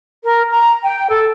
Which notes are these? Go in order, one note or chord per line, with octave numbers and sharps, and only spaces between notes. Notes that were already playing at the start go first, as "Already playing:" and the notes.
A#4
A#5
G5
A4